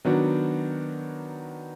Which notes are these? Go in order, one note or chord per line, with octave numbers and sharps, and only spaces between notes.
D#3 F#3 B3 D4 F#4